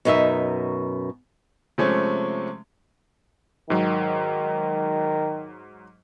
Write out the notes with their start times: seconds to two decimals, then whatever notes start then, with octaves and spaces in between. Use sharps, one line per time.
0.05 F#2 B2 D#4 A#4 E5
1.78 C3 F3 G#3 A3 C#4
3.70 G#2 D#3 F#3